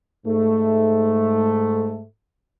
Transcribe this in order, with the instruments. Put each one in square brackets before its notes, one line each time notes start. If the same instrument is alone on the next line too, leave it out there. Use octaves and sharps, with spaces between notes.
[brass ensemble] G#2 A3